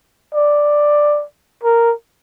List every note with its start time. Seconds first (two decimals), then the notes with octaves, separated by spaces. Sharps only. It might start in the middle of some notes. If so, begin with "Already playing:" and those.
0.34 D5
1.63 A#4